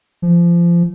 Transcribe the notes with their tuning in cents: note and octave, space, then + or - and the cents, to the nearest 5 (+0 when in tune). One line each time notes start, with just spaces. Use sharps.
F3 -25